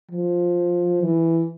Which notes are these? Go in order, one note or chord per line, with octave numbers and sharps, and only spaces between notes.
F3
E3